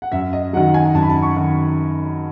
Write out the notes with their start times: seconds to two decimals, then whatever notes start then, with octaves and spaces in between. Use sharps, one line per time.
0.02 F#5
0.12 F#2 E5
0.33 D#5
0.53 F#3 F#5
0.57 D#3
0.74 G#5
0.95 F#2 A5
1.03 B5
1.10 A5
1.22 C#6
1.37 D#3